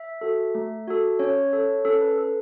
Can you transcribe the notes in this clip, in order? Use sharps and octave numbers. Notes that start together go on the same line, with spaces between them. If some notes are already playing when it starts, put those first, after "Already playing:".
Already playing: E5
F#4 A4
A3
F#4 A4
C#4 C#5
A4
C#4 A4
B4
A4